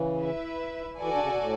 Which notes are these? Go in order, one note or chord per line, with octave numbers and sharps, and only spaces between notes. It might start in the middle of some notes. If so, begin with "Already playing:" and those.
Already playing: C#3 E3
E4 B4 E5
E3 F#4 A4 D5 G#5
D3
C#3
B2
A2